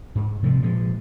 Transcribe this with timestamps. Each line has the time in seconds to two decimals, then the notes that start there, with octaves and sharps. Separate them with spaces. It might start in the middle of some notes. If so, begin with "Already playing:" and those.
0.15 G#2
0.43 C3 F3 G#3
0.63 A#2 F3 G#3